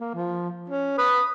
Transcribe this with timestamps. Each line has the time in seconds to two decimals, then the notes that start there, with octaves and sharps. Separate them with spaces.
0.01 A#3
0.14 F3
0.70 C#4
0.98 B4 D#6